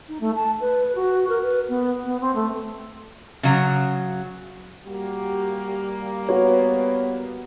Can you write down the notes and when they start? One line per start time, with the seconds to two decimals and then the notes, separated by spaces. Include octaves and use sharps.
0.09 D#4
0.20 A3
0.35 A5
0.61 B4
0.96 F#4
1.29 A#4
1.43 B4
1.69 B3
2.05 B3
2.21 C4
2.35 A3
3.43 C#3 F#3
4.85 G3 A#3 F#4 G4
6.29 B3 F#4 B4 C#5